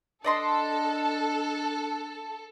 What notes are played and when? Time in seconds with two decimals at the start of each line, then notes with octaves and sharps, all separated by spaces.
0.24 D4 A4 D5 D#5 C6